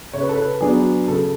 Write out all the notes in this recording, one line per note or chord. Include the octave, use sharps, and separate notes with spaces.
C#3 C#5
B4
A4
B4
F#3 B3 D4 G#4
C#3 A4